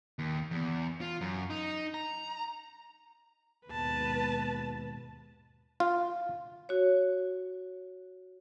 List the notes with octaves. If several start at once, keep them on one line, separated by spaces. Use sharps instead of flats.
D#2
E2
F4
F#2
D#4
A#5
D#2 G#2 B2 B4 A5
F4
F#4 C#5